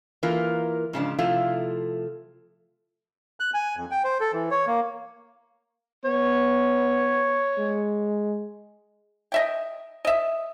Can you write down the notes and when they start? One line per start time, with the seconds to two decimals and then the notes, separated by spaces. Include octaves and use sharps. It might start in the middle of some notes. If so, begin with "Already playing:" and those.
0.23 E3 A#3 F4 A#4
0.93 G#2 C#3 F3 D4
1.19 C3 F3 A3 E4 F4
3.40 F#6
3.54 G#5
3.77 F2
3.91 G5
4.04 C5
4.20 A4
4.33 E3
4.51 C#5
4.67 A#3
6.05 B3 C#5
7.58 G#3
9.32 D#5 E5 G5
10.05 D#5 E5